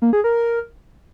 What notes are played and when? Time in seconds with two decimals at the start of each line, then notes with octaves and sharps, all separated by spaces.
0.02 A#3
0.13 G#4
0.24 A#4